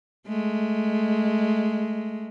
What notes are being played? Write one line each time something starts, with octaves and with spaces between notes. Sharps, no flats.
G#3 A3